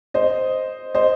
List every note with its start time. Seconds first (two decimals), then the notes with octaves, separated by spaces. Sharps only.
0.14 C5 D#5
0.95 C5 D#5